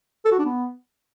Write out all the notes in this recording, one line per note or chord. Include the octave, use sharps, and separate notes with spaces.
A4
F#4
D4
B3